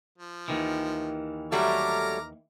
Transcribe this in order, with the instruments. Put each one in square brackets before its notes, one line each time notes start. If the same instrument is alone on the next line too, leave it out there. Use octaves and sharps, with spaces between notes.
[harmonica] F3
[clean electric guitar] D#2 D#3 E3
[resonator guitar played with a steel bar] F#3 G3 A3 [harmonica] A#5 D6 F6